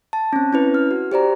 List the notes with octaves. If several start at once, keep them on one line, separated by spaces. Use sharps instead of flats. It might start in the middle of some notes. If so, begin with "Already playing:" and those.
A5
C4 C#4
C#4 E4 B4
F6
F#4
G4 C5 D5 A#5